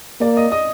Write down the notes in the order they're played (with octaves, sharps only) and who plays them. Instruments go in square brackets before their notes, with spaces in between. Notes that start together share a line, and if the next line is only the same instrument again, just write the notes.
[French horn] A#3 [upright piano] D5
[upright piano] D#5
D#5